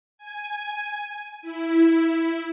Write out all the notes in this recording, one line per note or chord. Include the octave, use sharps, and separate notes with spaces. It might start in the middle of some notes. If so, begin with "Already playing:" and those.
G#5
E4